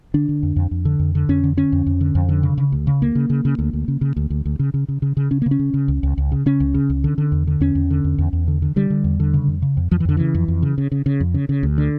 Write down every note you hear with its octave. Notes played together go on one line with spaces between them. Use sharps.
D3 D4
D3
F2
F2
F2
D3
F2
D3
F2 C#4
D3
D3 C#4
F2
F2
D3
F2
D3
C#3
C#3
D2
C#3
D2 A#3
C#3
C#3
C#3
D2
D2
C#3
C#3
D2
D2
D2
C#3
C#3
C#3
C#3
C#3
C#3 C#4
A#3
C#3
C#4
C#3
C#3
C#2
C#2
C#2
C#3
C#3 C#4
C#2
C#3
C#2
D3
D3
E2
D3
E2 C#4
E2
D3
E2
E2
E2
D3
D3
D3 G3
D3
E2
D3
C#3
F2
C#3
F2
F2 F3
E3
F2 D3
C#3 E3
F2
F2
C#3
C#3
C#3
C#3
F2
C#3
C#3
D2
D3